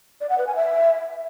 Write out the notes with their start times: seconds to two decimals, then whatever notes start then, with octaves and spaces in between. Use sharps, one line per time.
0.21 D5
0.29 F#5
0.38 B4
0.47 G#5
0.56 E5